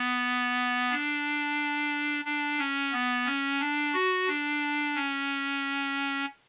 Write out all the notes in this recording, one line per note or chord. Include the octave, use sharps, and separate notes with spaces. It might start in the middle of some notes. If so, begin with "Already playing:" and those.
Already playing: B3
D4
D4
C#4
B3
C#4
D4
F#4
D4
C#4